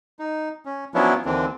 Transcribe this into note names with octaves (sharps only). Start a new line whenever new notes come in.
D#4
C#4
F3 F#3 B3 C#4 D4 E4
D#2 D3 E3 C4 D4